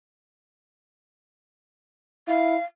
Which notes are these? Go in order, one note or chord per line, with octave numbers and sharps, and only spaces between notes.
E4 F5